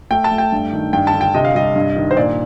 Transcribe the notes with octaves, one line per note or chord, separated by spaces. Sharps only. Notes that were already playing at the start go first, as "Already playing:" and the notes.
A3 G5
A5
A3
G5
G2
D#3
G2 G5
A5
D3
G5
C3 D#5
F5
G3 D#5
G2
D#3
C5
A#2 D5